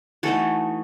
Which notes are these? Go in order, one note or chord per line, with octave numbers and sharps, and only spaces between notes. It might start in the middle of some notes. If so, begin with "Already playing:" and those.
E3 A3 D#4 F#4 A4